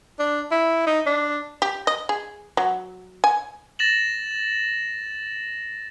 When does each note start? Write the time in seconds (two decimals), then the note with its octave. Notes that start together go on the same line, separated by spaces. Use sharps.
0.19 D4
0.51 E4
0.87 D#4
1.07 D4
1.62 G4
1.87 D#5
2.09 G#4
2.57 F#3
3.24 G#5
3.79 A6 A#6 E7 F#7